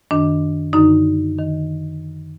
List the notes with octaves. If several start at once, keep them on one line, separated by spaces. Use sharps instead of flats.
F#2 D#3 D4
F#2 D3 D#4
D#3